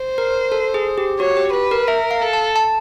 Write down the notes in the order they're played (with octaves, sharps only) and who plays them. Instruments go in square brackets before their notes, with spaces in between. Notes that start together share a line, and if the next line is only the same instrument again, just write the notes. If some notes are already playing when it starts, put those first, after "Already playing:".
Already playing: [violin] C5
[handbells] A#4
A4
G#4
G4
[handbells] F#4 [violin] C#5
[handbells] G4
[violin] B4
[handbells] A#4
[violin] A#4 [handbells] E5
[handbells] F5
[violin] A4
[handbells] A5
A5